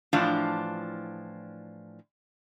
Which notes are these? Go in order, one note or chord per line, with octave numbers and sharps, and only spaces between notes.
A2 E3 F3 D4 F4